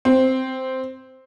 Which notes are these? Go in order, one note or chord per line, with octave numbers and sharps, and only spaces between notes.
C4